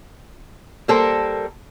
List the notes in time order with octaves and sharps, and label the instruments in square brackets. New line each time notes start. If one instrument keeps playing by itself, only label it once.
[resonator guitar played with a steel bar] G3 A#3 A4 A#4 C5